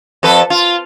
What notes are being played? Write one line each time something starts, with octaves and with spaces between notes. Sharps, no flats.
F2 A4 B4
F4